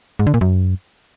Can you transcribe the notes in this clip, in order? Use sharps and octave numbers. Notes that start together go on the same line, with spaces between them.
G#2
D3
A#2
F#2